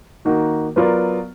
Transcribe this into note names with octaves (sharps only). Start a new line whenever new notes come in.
D#3 A#3 D#4 F#4
F#3 B3 F4 A#4 D5